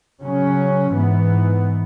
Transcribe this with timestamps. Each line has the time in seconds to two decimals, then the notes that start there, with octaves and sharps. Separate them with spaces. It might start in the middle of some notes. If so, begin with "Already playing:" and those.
0.21 C#3 F#3 C#4
0.94 G#2 E3 B3